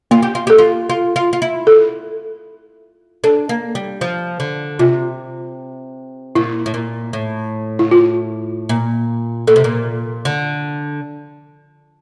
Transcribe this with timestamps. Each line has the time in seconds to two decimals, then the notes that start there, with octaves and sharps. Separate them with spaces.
0.11 A#3 F4
0.23 G4
0.35 F4
0.47 G4 A4
0.58 F4
0.90 F4
1.16 F4
1.33 F4
1.42 E4
1.67 A4
3.24 D4 A4
3.49 A#3
3.75 G3
4.01 F3
4.40 D3
4.79 C3 F4
6.35 A#2 E4
6.66 A2
6.74 A#2
7.13 A2
7.79 E4
7.91 F4
8.69 A#2
9.47 A#2 A4
9.56 C3
9.64 A#2
10.25 D3